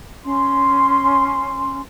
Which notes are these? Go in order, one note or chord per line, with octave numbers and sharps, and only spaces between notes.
C#4 C6